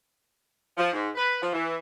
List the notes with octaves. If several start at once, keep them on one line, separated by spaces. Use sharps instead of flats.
F3
G#2
B4
F3
E3